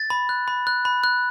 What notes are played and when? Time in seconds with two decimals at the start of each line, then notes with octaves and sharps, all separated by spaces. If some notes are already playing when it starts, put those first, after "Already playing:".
Already playing: A6
0.10 B5
0.29 F#6
0.48 B5
0.67 F#6
0.85 B5
1.04 F#6